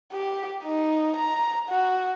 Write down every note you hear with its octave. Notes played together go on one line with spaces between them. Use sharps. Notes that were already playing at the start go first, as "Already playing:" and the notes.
G4
D#4
A#5
F#4